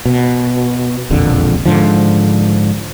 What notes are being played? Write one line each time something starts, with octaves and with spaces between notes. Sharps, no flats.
B2
E1 A#1 F2 D3
G#2 D3 F3